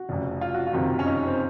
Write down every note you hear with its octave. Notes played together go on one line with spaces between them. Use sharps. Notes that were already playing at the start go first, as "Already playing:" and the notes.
Already playing: F#4
F1 F2 C#3
F4
F#4
F4
F#1 F2 C3 D#3
C#4
D#4
C4